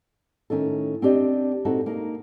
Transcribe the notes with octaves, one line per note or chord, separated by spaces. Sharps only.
A2 D#3 C#4 D#4 A4
C4 D4 G4 D5 D#5
A#2 C4 D#4 F#4 A4
A#3 D#4